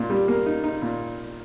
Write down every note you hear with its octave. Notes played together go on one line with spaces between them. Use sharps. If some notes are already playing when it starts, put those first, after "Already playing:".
Already playing: A#2 D#4
G3
A#3
D#4
D#4
A#2